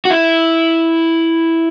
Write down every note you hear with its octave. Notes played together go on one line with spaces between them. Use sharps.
F#4
E4